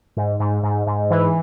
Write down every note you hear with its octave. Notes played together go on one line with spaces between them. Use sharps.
G#2
G#2
G#2
G#2
E3